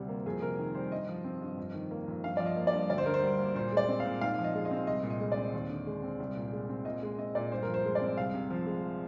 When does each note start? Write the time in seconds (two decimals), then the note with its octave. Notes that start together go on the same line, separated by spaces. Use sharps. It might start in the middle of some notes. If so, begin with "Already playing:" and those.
Already playing: D2 C3 G3
0.09 A#3
0.26 F2 G#4
0.42 C3 A#4
0.59 D#3
0.75 G3 C5
0.91 G2 D#5
1.08 F3
1.24 C4
1.42 G2
1.58 F2
1.74 D#3
1.91 A#3
2.08 F2
2.23 G2 F5
2.37 F3 D5
2.46 D#5
2.56 A#3
2.67 D5
2.73 G2
2.90 D2 D5
2.98 C5
3.06 D3 A#4
3.14 C5
3.23 G3
3.39 A#3
3.55 A#2 C5
3.72 G#3 D5
3.88 C4
4.00 F5
4.05 A#2
4.21 G#2 F5
4.39 F3
4.44 D#5
4.55 G#3
4.65 D#5
4.71 C4
4.87 C2 D#5
5.03 A#2
5.10 D#5
5.20 G#3
5.32 D5
5.37 C4
5.53 D#2
5.70 D3
5.86 G#3
6.03 C4
6.20 C2
6.36 A#2
6.52 G#3
6.69 C4
6.85 A#2 D#5
7.03 G#3
7.18 C4 D#5
7.35 A#2 D5
7.51 G2 C5
7.62 F3 A#4
7.74 C5
7.85 G#3
7.95 D5
8.01 C4
8.18 C2 F5
8.34 C3
8.50 F3
8.66 G#3